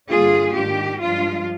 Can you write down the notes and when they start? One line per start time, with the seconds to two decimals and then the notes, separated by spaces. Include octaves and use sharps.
0.09 G2 D3 G3 A#3 D4 F4 G#4
0.55 G#2 D#3 G#3 D4 G4
1.01 G2 F3 G#3 D4 F4